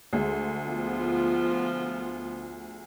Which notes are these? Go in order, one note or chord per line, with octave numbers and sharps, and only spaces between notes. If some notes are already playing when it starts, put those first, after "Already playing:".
D2 G#3
F3 B3 F4